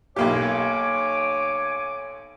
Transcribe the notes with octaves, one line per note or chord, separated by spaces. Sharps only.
B1 A#3 G4 C#5 G#5 D6